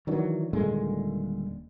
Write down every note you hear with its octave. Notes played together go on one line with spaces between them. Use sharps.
D#3 E3 F#3 D4
D#1 A#2 D3 G#3